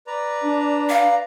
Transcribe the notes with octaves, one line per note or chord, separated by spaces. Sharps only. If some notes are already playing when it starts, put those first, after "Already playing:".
B4 D5 A#5
D4
F5